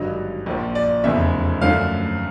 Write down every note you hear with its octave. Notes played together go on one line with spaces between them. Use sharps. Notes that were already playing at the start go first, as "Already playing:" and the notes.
Already playing: G#1 G2 D3 F#3 D#5
A#1 A#2 F3
D5
F1 E2 C#3 E5
F#2 D3 F3 A3 F5